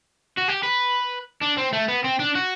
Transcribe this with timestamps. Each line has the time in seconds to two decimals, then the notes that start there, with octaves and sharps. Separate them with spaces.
0.37 F#4
0.48 G4
0.63 B4
1.41 D4
1.57 C4
1.73 A3
1.88 B3
2.04 C4
2.20 D4
2.35 F#4